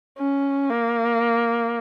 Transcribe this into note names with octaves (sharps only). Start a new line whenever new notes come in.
C#4
A#3